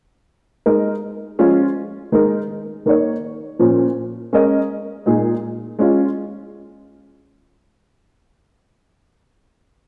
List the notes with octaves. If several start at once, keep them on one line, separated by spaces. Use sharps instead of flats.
G#3 D#4 A#4 D#5
F3 G#3 C#4 F4
D#3 G#3 D#4 A#4
D#3 A#3 D#4 C#5
A#2 F3 C#4
G#3 C#4 A#4 D#5
A#2 G#3 D#4 G#4
G#3 C#4 F4